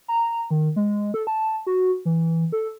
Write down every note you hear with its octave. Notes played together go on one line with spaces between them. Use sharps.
A#5
D#3
G#3
A4
A5
F#4
E3
A4